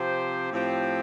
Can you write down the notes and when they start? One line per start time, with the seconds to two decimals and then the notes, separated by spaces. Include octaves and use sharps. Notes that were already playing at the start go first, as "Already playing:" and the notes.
Already playing: C3 F3 C4 G4 C5
0.50 A2 F3 C4 G4